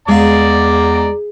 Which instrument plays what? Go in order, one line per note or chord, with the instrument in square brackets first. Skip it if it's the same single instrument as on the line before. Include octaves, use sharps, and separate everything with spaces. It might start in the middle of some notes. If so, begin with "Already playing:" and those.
[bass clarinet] E2 [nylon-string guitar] G#3 F5 [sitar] G#4 [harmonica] D5 A#5 D6